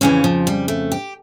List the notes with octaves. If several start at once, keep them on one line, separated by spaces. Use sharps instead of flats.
F2 C#3 E3 C#4
F3
G3
A3
G4